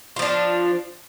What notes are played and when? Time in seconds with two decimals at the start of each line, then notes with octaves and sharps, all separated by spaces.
0.16 F4
0.19 F3
0.22 D4